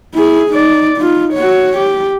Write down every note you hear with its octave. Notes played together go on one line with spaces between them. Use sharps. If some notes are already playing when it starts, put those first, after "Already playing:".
E4 G#4
D#4 D5
D#4 F4
F#4 C#5
G4